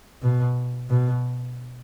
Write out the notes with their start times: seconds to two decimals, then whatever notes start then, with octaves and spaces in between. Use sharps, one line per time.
0.22 B2
0.90 B2